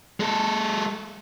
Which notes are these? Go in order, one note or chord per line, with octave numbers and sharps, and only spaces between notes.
G#3 A4